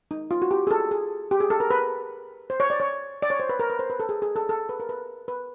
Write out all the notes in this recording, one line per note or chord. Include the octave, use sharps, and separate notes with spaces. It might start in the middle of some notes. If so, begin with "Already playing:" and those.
D#4
F4
F#4
G4
G#4
A4
G#4
G4
G#4
A4
A#4
B4
C5
C#5
D5
C#5
D5
C#5
C5
B4
A#4
B4
C5
B4
A4
G#4
G#4
A4
A4
B4
A#4
B4
B4